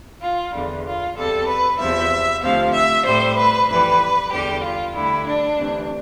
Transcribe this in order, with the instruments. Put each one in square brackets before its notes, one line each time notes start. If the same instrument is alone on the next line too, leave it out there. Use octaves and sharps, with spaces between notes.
[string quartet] F4
E2 D3 G3
F4
E2 C3 G3 A4
B4
E2 C3 F3 E5
D2 C3 F3 F5
E5
A2 G3 C5
B4
F2 E3 G3 B4
E2 D3 G3 G4
F4
D2 D3 G3 E4
D4
D2 C3 E3